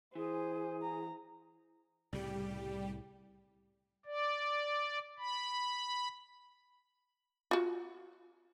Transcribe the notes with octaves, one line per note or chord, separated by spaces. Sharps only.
E3 G#4 C5 G#5
A#5
C2 A2 C#3 G3 G4
D5
B5
F4 F#4